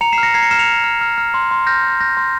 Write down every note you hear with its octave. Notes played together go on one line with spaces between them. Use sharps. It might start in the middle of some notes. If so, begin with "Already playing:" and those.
A#5 C#7 F7
C7 E7
F6
A#6 C#7
A#5 G#6 C7
A#6 C#7
F6 C7 E7
C#7 F7
F6
F6
F6
F6
C6
C6
F6 G6 A#6
C6
F6 G6 A#6
C6